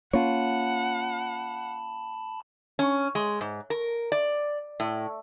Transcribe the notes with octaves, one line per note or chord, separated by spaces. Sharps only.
A#3 C#4 F4 C#5 F#5 A5 B5
C#4
G#3
G#2
A#4
D5
A2